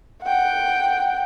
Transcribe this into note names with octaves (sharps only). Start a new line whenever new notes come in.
F#5 G5